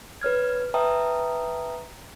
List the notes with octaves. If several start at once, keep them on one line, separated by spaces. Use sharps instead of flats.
B4 C#5 F6 G#6
B4 E5 G5 A5 A#5 D#6